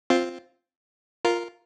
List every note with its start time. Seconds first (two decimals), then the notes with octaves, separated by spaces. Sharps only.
0.10 C4 F4
1.25 F4 A#4